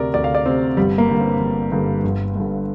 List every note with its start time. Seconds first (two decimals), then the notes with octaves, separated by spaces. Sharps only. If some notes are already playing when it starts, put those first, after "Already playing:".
Already playing: D2 C3 A#4 D5
0.14 D2 D5
0.24 F5
0.35 D5
0.46 C3 C4
0.77 G1 G3
0.98 A#3
1.09 G2 D3
1.20 C4
1.40 G1
1.72 G2 D3
2.04 G1
2.36 G2 D3